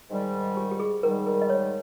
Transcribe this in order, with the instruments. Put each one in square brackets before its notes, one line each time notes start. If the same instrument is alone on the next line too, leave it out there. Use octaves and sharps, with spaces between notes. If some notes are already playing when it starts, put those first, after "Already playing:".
[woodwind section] G#2 D#3 G3
[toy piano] G4
G4
G#4
[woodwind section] G#2 D#3 G3 [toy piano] A#4
[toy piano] A#4
D#5
C#5